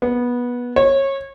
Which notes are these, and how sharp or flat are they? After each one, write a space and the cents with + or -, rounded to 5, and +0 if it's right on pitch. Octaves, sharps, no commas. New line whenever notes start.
B3 -20
C#5 -20